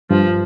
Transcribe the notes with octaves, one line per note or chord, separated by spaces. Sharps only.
G2 F3